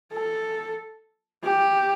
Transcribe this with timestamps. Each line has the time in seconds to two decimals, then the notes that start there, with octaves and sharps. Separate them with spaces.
0.12 A4
1.44 G4